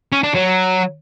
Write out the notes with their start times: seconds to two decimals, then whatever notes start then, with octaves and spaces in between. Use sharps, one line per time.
0.12 C#4
0.24 D4
0.35 F#3